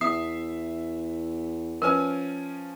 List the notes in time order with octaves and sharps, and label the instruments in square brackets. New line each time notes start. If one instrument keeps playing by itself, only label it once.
[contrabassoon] E2 [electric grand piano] E5 C7 [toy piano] D#6
[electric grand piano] F3 C#4 G#5 [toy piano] A#4 B4